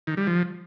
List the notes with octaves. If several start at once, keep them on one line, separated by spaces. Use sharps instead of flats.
D#3
G3
F3